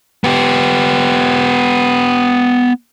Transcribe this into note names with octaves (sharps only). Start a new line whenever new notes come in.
B3 G4